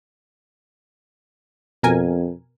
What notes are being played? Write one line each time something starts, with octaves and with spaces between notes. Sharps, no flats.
F2 B2 A#4 G#5